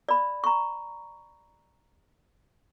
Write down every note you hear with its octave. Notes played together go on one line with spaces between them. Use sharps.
D5 B5
A#5 C#6